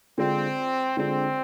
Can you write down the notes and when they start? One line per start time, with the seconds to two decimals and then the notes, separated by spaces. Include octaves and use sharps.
0.18 D3 G#3 C4 D4 F4
0.97 D3 G#3 C4 D4 F4